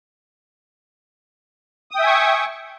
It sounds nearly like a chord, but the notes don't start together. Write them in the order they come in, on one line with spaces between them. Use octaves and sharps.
D#6 G5 E5 G#5 C#6